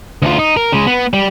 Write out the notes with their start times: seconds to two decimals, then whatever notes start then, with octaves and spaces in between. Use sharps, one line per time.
0.22 D2 F4
0.39 D#4
0.57 A#4
0.72 C#3 G#3
0.87 B3
1.13 G3